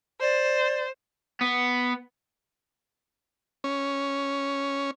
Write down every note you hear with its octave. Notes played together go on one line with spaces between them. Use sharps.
C5 D5
B3
C#4